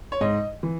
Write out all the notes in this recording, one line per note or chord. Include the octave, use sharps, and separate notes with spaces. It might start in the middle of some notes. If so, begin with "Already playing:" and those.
C#5
G#2 D#5
E3